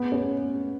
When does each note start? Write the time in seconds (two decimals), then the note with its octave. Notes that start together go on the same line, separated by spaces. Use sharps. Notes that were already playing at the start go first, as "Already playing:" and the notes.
Already playing: B3
0.12 C#4